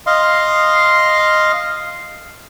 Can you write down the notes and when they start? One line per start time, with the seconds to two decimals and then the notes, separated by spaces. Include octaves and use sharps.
0.07 D#5 F5 C6